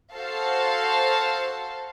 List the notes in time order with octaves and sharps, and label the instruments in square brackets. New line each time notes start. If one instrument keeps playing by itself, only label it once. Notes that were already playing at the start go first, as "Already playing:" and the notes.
[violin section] F#4 A4 C5 F5 A5